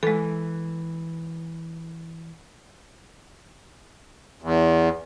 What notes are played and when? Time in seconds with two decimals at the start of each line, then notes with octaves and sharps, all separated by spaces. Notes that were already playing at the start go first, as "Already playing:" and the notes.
0.03 E3 G#3 A4
4.42 E2